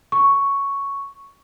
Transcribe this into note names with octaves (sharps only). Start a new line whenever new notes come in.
C#6